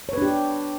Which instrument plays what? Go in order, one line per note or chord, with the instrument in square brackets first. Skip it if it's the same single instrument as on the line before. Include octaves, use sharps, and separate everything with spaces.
[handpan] C#5
B4
D4
G4